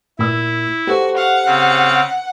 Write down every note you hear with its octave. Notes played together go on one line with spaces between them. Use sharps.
A#2 E4 E6
F#4 G4 A4 C5
F5 F#5
C#3 C4 F5